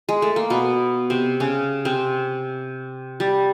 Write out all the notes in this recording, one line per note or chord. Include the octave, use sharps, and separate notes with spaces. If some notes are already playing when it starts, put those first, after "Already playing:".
G#3
A3
A#3
B2 B3
C3 C4
C#3 C#4
C3 C4
G3